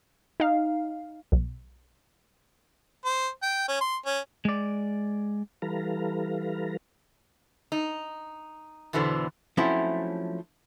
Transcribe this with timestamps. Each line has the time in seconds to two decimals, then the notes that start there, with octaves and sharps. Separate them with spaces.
0.40 D#4 F5
1.32 B1
3.05 C5
3.43 G5
3.69 C#4
3.81 C6
4.06 C#4
4.45 G#3 D5
5.62 E3 G3 A4 B4 F5 A#5
7.72 D#4
8.93 E2 B2 D3 E3 B3 C5
9.57 F3 F#3 A3 C4 C#4 E4